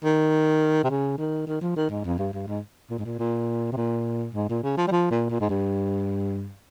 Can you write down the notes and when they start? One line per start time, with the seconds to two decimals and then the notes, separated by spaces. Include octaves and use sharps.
0.04 D#3
0.84 C3
0.90 C#3
1.18 D#3
1.47 D#3
1.61 F3
1.76 D#3
1.90 G#2
2.05 F2
2.18 G2
2.33 G2
2.47 G#2
2.90 A#2
2.98 G#2
3.05 A#2
3.19 A#2
3.72 C3
3.77 A#2
4.34 G#2
4.49 A#2
4.63 C#3
4.77 F3
4.87 G3
4.92 F3
5.11 A#2
5.30 A#2
5.40 G#2
5.50 G2